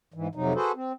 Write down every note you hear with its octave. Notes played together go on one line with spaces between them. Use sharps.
G#2 E3
F2 C3 F#3 D#4
F#4 G#4 A4 B4 C5
C4